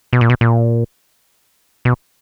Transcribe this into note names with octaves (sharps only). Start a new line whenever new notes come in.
B2
A#2
B2
A#2
B2